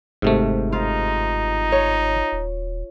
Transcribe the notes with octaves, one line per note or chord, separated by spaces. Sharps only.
G1 G#2 C3 A3
D#4 F4
C#5
D#1